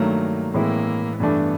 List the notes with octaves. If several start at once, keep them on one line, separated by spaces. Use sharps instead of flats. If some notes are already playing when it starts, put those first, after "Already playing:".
Already playing: G2 D#3 F#3 A3 A#3
A2 E3 G#3 A#3 C4 E4
G2 E3 A3 B3 D4